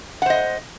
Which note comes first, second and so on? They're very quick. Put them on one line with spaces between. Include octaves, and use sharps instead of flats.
F#5 C5 D#5